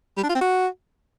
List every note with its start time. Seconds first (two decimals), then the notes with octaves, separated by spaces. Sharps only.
0.17 G3
0.23 D4
0.29 F4
0.35 C4
0.41 F#4